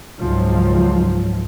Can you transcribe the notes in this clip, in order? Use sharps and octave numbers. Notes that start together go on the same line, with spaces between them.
C#2 G#2 F3 F#3